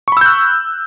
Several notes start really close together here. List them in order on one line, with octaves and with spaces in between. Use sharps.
C#6 B5 E6 G6 F#6